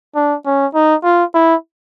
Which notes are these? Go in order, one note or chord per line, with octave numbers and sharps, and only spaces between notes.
D4
C#4
D#4
F4
E4